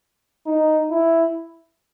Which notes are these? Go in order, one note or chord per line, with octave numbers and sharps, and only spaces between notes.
D#4
E4